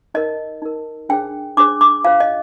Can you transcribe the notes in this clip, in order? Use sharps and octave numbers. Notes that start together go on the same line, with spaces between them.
D#4 A#4 D#5
D#4 A#4
D4 G#4 C5 G5
D4 G#4 C5 D6
D6
F4 C5 F5
D#5